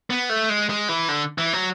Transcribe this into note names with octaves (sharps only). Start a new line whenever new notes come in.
B3
A3
G#3
G#3
E3
D3
E3
F#3